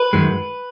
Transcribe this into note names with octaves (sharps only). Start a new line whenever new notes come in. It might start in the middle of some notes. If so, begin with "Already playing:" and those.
Already playing: B4
F#2 D#3 G#3